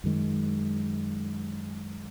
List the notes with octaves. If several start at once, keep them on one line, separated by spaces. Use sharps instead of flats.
F#2 D#3 G#3